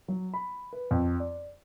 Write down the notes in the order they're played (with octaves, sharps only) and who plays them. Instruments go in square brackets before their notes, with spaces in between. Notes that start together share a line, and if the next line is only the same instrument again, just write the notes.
[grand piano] F#3
B5
B4
F2
D5